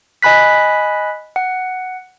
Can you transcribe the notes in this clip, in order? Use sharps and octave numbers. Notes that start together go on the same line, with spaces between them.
D#5 G#5 B5 F#6 B6
F#5